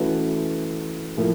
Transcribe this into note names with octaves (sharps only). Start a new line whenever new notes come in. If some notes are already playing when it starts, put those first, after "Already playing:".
Already playing: E3 A3 C#4 F#4 B4
A2 F3 A#3